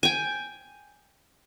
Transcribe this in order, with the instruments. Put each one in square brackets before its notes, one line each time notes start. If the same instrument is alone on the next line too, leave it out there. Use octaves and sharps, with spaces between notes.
[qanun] G5 G#5